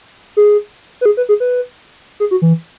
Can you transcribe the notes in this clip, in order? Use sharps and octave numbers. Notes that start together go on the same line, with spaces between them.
G#4
B4
G#4
B4
G#4
B4
G#4
F#4
E3